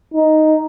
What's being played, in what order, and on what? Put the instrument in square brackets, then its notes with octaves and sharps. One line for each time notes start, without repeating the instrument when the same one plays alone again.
[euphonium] D#4